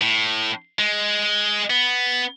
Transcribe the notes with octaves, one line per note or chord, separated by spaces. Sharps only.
A2
G#3
B3